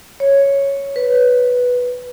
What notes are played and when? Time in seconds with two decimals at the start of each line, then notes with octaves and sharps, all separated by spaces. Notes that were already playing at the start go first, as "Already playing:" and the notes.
0.20 C#5
0.96 B4